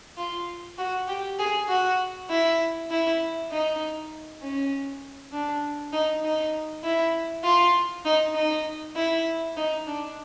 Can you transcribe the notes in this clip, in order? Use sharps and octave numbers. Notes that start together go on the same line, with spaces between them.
F4
F#4
G4
G#4
F#4
E4
E4
D#4
C#4
D4
D#4
D#4
E4
F4
D#4
D#4
E4
D#4
D4